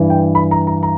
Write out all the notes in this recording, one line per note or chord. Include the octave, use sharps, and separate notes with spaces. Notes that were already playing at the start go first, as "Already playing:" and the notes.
Already playing: G2 E3
G5
B5
A#5
A#5
A#5